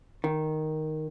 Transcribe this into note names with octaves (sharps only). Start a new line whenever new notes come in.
D#3